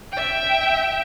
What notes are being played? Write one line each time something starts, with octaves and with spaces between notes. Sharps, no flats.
E5 G5